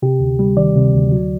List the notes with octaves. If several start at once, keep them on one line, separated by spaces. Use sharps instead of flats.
C3 G4
D2
G3
D#3 D5
C3
D2
F#3